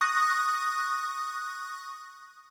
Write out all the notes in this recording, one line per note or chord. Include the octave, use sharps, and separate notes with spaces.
C#6 D#6 F#6 A#6